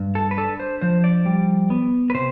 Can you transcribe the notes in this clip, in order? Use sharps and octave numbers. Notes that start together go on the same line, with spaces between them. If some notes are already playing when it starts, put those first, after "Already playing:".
Already playing: G2
A4
B4
D4 A4
C5
F3 C5
D5
G3
B3
B4
C3 C5